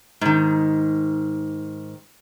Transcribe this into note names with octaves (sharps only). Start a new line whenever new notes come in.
G#2 D#3